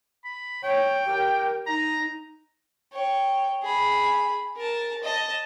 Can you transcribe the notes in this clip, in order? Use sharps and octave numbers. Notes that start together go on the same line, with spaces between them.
B5
C#5 G5
G4 A#4
D#4 A#5
C#5 G5
G#4 B5
A#4 A5
D#5 A5